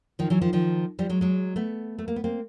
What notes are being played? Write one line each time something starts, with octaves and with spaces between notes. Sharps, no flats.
D#3 F3
E3 F#3
D#3 F3
D#3 F3
F3 G3
F#3 G#3
F#3 G#3
A3 B3
A3
A#3
B3
A#3 C4